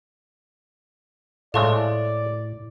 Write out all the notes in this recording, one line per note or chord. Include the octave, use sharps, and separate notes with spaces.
A2 G#3 A3 F4 A4 C#5 D5 E5